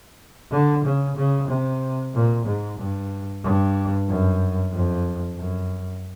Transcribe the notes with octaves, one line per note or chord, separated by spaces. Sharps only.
D3
C#3
C#3
C3
A#2
G#2
G2
G2
F#2
F2
F#2